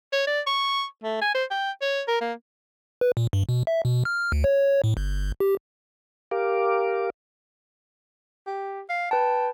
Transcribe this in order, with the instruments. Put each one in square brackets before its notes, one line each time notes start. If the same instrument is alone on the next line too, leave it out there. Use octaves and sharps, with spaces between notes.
[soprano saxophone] C#5
D5
C#6
A3
G#5
C5
G5
C#5
A#4
A#3
[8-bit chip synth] B4
A#2
G2
B2
E5
B2
F6
D2
C#5
A2
G1
G4
[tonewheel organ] G4 A#4 F5 D6
[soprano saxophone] G4
F5
[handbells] B4 A5 [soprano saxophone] G5